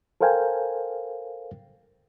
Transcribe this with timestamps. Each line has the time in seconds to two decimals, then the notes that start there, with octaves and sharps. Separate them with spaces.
0.21 A4 A#4 C5 F5 G5 G#5